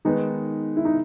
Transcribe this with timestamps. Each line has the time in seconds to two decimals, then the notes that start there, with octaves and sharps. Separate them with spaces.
0.05 D#3 G#3 B3 D#4
0.77 E4
0.85 D#4